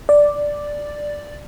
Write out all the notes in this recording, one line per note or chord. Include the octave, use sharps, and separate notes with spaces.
D5